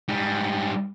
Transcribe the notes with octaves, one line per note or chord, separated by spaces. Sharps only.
G#2 G3